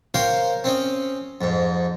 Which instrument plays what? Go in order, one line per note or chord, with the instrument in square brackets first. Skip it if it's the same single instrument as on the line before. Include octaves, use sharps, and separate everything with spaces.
[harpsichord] A#4 C5 C#5 F5 G5
C4 C#4 D#5
F2 G#2